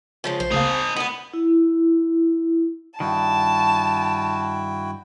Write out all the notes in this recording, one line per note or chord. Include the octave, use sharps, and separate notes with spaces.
C#3 F3 G#3
A#1 C5
D2 C#3 A#3 D#4 A5
G#5 C#7 D#7
D2 G2 B3
E4
G2 D#3 E4 F#4 G5 A5